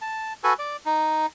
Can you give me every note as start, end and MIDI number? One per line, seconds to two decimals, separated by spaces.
0.01 0.33 81
0.44 0.53 66
0.44 0.53 69
0.44 0.53 71
0.44 0.53 80
0.59 0.77 74
0.86 1.26 63